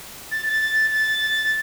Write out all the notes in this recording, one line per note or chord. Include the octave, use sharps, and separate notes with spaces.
A6
A6
A6